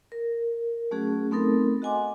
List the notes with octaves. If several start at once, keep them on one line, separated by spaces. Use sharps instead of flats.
A#4
F#3 A3 C#4 F#4 G#4
A3 B3 C4 D#4 A4 A#4
F#4 D#5 F#5 G#5 C6 D6